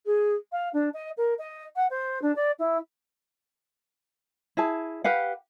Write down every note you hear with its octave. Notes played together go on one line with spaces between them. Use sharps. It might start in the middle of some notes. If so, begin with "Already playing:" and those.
G#4
F5
D4
D#5
A#4
D#5
F#5
C5
D4
D5
E4
E4 G#4 A5
G4 B4 F5 F#5